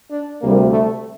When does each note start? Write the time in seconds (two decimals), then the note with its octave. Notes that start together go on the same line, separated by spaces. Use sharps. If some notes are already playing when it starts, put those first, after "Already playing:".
0.11 D4
0.41 D2 C3 G3 A#3
0.71 A3